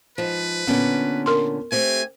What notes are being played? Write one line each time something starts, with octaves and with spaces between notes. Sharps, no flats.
G#2 F3 B4
A#2 D3 B3 C#4
A#4 C6
A3 C4 G4 G#5